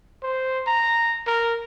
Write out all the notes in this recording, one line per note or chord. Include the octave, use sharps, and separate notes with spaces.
C5
A#5
A#4